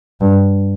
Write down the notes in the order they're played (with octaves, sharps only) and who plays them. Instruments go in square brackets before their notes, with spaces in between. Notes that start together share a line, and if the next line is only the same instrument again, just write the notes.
[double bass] G2